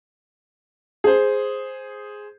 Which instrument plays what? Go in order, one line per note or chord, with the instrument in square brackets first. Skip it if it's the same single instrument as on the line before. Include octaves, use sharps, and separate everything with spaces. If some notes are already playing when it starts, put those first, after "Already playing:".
[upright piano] G#4 C5